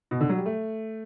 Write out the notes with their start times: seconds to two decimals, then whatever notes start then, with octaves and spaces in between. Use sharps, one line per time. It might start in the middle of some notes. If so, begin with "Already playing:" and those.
0.11 B2
0.21 D3
0.29 F#3
0.37 G3
0.46 A3